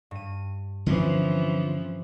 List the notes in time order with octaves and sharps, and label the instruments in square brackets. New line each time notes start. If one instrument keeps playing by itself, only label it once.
[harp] G2 D#7
[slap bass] D3 C4 C#4 [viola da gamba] E3 F3